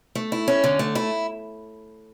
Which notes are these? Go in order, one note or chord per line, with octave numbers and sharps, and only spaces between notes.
A3
E4
C#4
D3
A3
E4